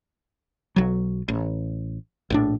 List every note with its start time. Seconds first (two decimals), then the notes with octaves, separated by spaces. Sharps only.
0.76 B1 F#3
1.28 A1
2.30 A#1 A2 D4